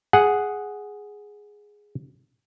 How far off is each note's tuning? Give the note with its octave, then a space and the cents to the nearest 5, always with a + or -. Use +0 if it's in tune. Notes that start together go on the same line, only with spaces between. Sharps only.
G#4 +0 F#5 +0